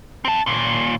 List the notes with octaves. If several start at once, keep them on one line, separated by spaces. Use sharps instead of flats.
C4 A5
D#2 A#2